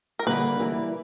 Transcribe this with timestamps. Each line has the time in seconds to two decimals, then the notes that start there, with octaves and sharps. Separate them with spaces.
0.19 A#4
0.26 D3 G3 A#3 B4
0.59 E3 G3 A#3